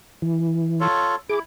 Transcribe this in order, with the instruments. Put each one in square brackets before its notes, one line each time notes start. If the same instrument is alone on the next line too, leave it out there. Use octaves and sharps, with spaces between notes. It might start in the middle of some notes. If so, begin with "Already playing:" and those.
[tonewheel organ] E3
[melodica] F4 A4 C#5
[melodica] E4 [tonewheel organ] G#4 D6